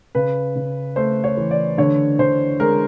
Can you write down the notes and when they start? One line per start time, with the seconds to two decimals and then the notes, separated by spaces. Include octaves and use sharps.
0.15 C#3 B4
0.55 C#3
0.96 A3 C5
1.24 C#5
1.37 E3
1.51 D5
1.78 D3 C#5
2.19 D3 C5
2.60 G#3 A#4